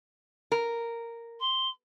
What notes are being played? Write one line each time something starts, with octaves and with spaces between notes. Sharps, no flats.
A#4
C6